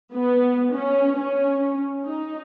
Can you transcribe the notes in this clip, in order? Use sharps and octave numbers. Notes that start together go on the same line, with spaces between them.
B3
C#4
C#4
D#4